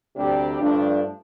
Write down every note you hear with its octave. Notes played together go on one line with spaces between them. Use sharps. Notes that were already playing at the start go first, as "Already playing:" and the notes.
D2 C3 G3 D4 G4
G2 F3 A3 D4